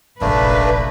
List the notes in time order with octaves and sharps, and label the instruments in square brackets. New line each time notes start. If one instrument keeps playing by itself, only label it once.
[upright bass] F1 A#1 [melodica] A3 A#3 D4 [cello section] B4